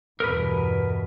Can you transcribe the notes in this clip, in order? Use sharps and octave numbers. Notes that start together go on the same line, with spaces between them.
E2 G2 B2 A#4 B4